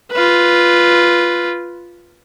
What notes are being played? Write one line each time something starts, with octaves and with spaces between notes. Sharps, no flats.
F4 B4